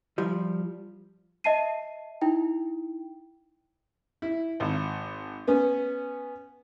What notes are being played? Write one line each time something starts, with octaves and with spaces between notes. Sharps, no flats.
F3 G3
D#5 E5 A5 C7 D#7
D#4 E4 G5
E4
G#1
B3 C#4